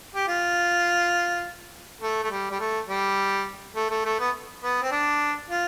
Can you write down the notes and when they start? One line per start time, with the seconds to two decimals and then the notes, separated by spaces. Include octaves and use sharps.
0.15 G4
0.28 F4
2.02 A3
2.23 A3
2.31 G3
2.51 G3
2.60 A3
2.89 G3
3.75 A3
3.90 A3
4.05 A3
4.20 B3
4.63 B3
4.82 C4
4.92 D4
5.50 F4